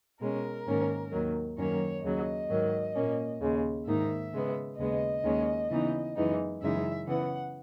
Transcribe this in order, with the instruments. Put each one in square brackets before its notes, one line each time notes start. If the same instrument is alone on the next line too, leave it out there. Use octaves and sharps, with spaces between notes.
[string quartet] B2 G#3 C#4 A#4
G#2 D#3 A#3 C#4
D#2 D#3 F#3
F#2 D#3 F#3 A#3 C#4 C#5
D#2 C#3 F#3 D#5
G#2 D#3 F#3
A#2 A#3 C#4
D#2 C#3 G#3
G#2 D#3 A#3 D#4 E5
C#3 G#3 B3
D#2 C#3 G#3 B3 D#5
D#2 D#3 G#3 C#4
C#3 E3 B3 D#4
F#2 E3 G#3 B3 D#4
F#2 C#3 E3 G#3 D#4 E5
C#3 E3 B3 F#5